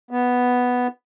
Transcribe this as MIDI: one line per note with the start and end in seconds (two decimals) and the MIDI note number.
0.11 0.87 59